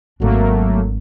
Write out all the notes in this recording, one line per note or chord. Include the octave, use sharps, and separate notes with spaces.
G#1 F#3 A3 A#3 D4